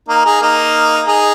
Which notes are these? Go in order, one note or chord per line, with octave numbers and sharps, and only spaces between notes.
A#3 D#4
D#4 G#4
A#3 D#4
D#4 G#4